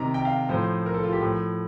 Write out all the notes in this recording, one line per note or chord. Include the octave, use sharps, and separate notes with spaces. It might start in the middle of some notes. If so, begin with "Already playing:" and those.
Already playing: C3 D#3 A#5
G5
F5
A2 F3 C5
A#4
A4
F4
G4
A2 F3